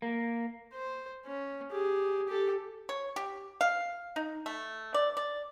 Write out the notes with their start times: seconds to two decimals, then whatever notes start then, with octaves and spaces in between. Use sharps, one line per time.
0.02 A#3
0.74 C5
1.26 C#4
1.72 G4 G#4
2.27 G4 A4
2.89 C#5
3.16 G4
3.61 F5
4.16 D#4
4.46 A3
4.94 D5
5.17 D5